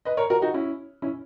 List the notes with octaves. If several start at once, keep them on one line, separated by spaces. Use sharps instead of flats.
B4 D#5
A#4 C#5
F#4 A#4
D#4 F#4
C#4 E4
C#4 E4